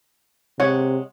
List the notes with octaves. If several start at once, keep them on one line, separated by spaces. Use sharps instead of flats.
C3 G#3 C#5 F#5